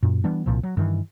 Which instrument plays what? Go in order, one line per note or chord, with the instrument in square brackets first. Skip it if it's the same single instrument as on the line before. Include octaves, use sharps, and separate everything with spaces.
[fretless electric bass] F#2 A#2
E3 G3 B3 D4
C2 A#2 F3
F#3
G2 D#3 E3